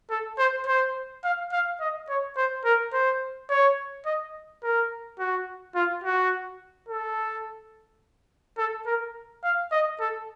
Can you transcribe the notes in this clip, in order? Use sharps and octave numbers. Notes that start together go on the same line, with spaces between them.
A4
C5
C5
F5
F5
D#5
C#5
C5
A#4
C5
C#5
D#5
A#4
F#4
F4
F#4
A4
A4
A#4
F5
D#5
A4